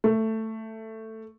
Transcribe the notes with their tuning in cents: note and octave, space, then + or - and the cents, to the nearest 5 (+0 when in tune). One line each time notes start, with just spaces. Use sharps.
A3 +10